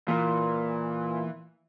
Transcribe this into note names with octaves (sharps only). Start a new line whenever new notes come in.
A#2 E3